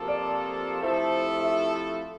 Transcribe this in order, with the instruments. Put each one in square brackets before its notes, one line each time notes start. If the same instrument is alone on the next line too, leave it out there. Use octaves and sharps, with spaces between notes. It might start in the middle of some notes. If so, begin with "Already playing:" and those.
Already playing: [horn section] C3 F3 A#3 F4 A4
[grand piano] D5
[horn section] C3 F3 A3 E4 A4 [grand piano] C5
[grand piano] E5